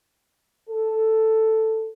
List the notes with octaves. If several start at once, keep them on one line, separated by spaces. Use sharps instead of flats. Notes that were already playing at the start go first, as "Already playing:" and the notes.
A4